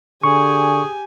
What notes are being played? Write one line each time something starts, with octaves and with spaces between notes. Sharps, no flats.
D3 G4 G#4 G#5 C#6